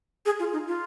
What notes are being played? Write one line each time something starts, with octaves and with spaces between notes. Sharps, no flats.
G#4
F4
D#4
F4